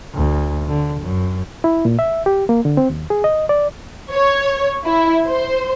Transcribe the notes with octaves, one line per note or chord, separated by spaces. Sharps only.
D2
D3
F#2
E4
A#2
E5
G4
A#3
D3
C4
D#2
G#4
D#5
D5
C#5
E4
C5